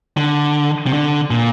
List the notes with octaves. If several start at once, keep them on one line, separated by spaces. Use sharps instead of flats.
D3
C3
D3
A#2